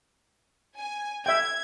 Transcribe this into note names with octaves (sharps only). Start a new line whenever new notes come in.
G#5
E5 G5 G#6